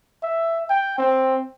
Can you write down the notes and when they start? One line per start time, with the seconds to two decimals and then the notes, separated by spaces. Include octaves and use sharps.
0.23 E5
0.70 G5
0.98 C4